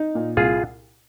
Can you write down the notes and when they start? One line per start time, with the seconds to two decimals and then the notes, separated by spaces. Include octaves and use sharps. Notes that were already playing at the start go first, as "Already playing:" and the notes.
Already playing: D#4
0.15 A#2
0.37 C2 F4 G#4